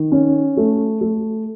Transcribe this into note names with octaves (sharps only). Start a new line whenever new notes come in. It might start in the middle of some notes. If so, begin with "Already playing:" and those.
Already playing: D#3
C#4
A3
A3